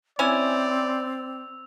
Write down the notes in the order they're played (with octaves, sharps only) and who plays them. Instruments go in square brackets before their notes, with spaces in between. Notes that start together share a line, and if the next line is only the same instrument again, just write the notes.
[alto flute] C4 [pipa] C#4 E4 G#5 [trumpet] D5 [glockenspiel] E6 F7